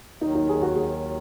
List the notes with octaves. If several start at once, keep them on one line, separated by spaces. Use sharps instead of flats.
D#2 D#3 F#3 D#4
D#4
G#4
F#4
G#4